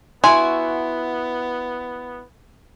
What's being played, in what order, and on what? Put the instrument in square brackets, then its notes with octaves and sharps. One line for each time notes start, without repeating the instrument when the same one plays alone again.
[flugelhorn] B3 [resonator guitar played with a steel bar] E4 F#4 [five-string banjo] G#5 [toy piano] C6